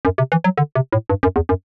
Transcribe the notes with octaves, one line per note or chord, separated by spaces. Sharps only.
F#2
C3
E3
F#3
D3
C3
A2
G2
F#2
E2
F#2